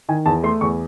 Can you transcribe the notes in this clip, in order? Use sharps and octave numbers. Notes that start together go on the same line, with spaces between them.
D#3 G#5
E2 A5
A3 C6
E2 C#6